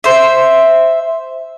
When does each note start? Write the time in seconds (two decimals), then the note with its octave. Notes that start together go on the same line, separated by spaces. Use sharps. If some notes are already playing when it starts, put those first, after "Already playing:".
0.04 C5 E5